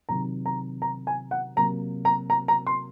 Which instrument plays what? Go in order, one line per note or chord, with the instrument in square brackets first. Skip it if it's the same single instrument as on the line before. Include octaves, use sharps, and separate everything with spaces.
[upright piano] C3 D#3 F#3 A#5
A#5
A#5
G#5
F#5
C3 F#3 A#3 A#5
A#5
A#5
A#5
C6